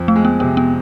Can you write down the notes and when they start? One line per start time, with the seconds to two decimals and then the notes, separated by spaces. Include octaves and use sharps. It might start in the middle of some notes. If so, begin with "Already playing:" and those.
Already playing: F2
0.08 A3
0.16 G#3
0.25 B3
0.40 C3 B3
0.57 B3